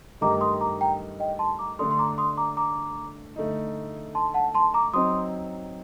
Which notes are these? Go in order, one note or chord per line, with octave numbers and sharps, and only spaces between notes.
G2 D#3 A3 D#4 G4 A#5 D6
C6 D#6
A#5 D6
G5 A#5
D#5 G5
A5 C6
A#5 D6
D3 A3 D4 A4 C6 D#6
C6
A#5 D6
C6 D#6
A#5 D6
A#5 D6
D3 A3 D#4
A5 C6
F#5 A5
A5 C6
A#5 D6
F#3 C4 D#4 C6 D#6